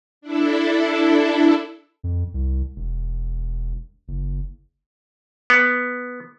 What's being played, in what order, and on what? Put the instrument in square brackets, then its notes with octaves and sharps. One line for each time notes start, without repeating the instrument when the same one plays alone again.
[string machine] D4 E4 A4
[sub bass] F2
C2
E1
F#1
[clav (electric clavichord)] B3